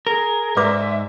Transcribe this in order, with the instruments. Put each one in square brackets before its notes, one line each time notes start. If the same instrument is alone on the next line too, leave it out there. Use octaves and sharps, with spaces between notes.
[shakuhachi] G#4 [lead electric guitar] A#4
[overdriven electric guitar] G#2 [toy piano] B4 D5 D6 [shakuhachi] E5